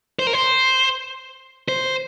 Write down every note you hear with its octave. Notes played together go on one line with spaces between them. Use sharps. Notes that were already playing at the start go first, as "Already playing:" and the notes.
C5
A#4
C5
C5